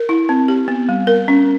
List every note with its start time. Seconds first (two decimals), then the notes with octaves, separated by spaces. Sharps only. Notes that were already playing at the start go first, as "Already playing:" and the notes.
Already playing: A#4
0.09 E4
0.29 C4
0.48 G4
0.68 B3
0.89 G3
1.07 A#4
1.28 C#4